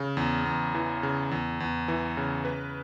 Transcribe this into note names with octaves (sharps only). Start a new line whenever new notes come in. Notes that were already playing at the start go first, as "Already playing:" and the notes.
Already playing: C#3
E2
E2
E3
C#3
E2
E2
E3
C#3
B4